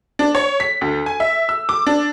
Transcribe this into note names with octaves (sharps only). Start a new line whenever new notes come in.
D4
C#5
B6
D2
G#5
E5
E6
D6
D4